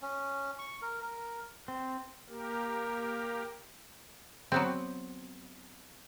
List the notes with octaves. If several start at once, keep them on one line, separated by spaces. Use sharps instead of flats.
C#4
C#6
A#4
A#4
C4
A#3 G4 A#4
F#3 B3 C4